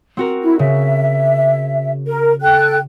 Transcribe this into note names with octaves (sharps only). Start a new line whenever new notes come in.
C4 F#4 A#4
E4
C#3 E5
A#4
A4 G5 F#6